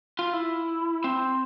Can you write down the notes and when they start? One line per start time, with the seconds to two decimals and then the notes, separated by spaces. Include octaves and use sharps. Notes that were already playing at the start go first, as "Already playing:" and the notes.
0.19 F4
0.33 E4
1.04 C4